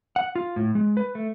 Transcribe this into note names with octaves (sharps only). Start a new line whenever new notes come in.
F#5
F4
A2
G#3
B4
A3